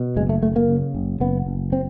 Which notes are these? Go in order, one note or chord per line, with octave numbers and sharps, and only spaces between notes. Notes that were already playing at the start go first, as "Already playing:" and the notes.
Already playing: B2
F#1 G#3
A3
F#1 A3
A#3
C#3
F#1
F#1 B3
F#1
C4